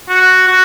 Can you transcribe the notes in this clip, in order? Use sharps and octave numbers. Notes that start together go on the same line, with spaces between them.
F#4
F#4